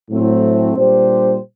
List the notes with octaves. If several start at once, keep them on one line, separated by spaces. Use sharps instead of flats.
A2 F#3 A3 C4
A#2 G3 D4 G4 C5